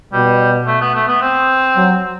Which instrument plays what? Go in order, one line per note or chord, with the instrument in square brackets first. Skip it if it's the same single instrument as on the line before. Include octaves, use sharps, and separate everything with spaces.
[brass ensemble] B2 [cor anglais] G3
[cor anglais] A3
B3
A3
B3
C4
[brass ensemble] F#3